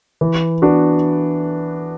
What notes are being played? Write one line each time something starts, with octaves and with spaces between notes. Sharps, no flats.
E3
B3 D4 F#4